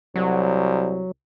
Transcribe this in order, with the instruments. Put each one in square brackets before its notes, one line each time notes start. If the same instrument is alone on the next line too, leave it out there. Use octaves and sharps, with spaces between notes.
[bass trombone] C2 [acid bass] F#3